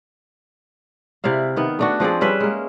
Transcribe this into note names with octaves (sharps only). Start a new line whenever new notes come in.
C3 E4 D5 F5
D#3 B3
A3 D4 F#4
F3 C4 G#4 D5
G3 C#4 B4 E5
G#3 A#3